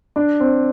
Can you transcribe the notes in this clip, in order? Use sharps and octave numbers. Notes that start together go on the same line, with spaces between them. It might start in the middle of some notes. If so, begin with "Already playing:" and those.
D4
C4